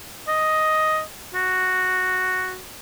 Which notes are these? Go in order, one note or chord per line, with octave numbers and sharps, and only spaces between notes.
D#5
F#4